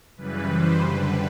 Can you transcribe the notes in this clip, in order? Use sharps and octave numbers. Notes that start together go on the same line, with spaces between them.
F#2 C#3 E3 G3 B4
C5
F#2 D3 G3 B4